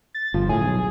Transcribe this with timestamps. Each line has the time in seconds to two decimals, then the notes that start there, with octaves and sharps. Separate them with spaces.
0.15 A6
0.34 G1 F3
0.49 A2 G#4
0.61 B1